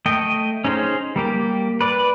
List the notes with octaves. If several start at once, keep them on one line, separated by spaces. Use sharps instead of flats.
A3 D#5 G5
C#4 D#4 G#4 C5
G3 A#3 G4
B4 D5